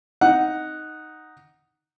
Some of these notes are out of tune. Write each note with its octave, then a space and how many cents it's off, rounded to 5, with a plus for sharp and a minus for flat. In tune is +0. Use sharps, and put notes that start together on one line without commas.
D#4 +0 F#5 +0